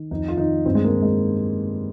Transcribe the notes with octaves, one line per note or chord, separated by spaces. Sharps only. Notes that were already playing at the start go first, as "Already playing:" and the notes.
Already playing: D#3
F2 D#4
F4
D#3 D#4
G2 C4
G#3
A#3
D#3
G#3